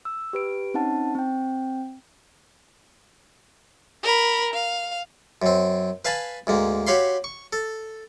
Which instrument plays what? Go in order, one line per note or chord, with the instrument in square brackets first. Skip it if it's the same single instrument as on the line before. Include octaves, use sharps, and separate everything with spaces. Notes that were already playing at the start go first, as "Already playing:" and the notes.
[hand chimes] E6
G4 B4 D7
C4 C#4 D#4 F#5 A5
C4 G5
[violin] A#4 B5
F5
[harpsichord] F#2 C4
B4 F5 G#5 A5 B5
D2 G#2 A#3
F#4 G4 C#5 F5 B5 C6
C#6
A4